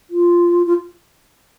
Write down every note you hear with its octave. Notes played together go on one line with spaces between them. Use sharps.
F4
F4